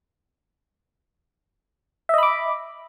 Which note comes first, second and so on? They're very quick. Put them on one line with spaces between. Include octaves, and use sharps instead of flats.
E5 D#5 B5 D6